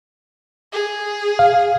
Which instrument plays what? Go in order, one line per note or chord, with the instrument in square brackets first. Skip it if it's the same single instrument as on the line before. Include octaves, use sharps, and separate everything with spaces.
[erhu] G#4
[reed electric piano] F5